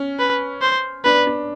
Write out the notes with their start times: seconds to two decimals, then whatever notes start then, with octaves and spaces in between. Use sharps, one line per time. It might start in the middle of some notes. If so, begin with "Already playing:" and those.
Already playing: C#4
0.19 B4
0.61 C5
1.05 D4 B4
1.27 D4